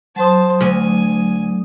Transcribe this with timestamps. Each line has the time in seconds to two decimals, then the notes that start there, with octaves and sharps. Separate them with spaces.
0.16 F#3 C5 A5 D#6
0.61 D2 G#5